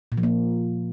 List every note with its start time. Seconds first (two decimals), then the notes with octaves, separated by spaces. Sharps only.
0.12 A#2
0.18 F3
0.23 A#3